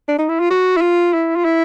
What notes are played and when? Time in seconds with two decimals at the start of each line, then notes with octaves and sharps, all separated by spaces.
0.08 D4
0.19 D#4
0.29 E4
0.40 F4
0.50 F#4
0.77 E4
0.81 F4
1.13 E4
1.36 F4
1.45 E4